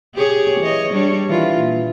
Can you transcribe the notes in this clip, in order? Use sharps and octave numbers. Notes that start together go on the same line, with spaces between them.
G4 G#4 C#5
E3 C#5 D#5
G3 D4 C#5
D#3 E3 F4
A#2